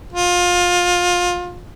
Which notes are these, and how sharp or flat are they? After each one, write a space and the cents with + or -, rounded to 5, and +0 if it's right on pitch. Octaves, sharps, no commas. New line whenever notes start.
F4 +25